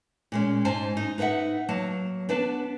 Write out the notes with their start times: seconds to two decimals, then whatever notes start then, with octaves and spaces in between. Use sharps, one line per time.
0.32 A#2 G#3 C#4
0.65 G#2 C5 G#5 A5
0.97 D#4
1.18 D#4 B4 D#5 E5 F#5
1.69 F#3 A#3 A5
2.29 B3 D4 B4 A5